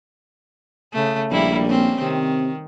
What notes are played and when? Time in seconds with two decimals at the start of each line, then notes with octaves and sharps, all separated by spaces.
0.94 C#3 A3
1.31 A#1 G3 A#3 E4
1.67 A#3 C4 C#4
2.02 C3 D#3